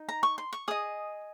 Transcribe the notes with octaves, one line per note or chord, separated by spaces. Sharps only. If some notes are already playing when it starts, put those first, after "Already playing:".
Already playing: D#4
A#5
C#6
C6
C#6
G#4 D#5 D#6